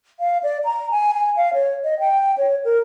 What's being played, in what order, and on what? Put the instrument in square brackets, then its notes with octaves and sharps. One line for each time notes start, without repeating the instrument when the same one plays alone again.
[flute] F5
D5
A#5
G#5
G#5
F5
C#5
D#5
G5
C#5
A#4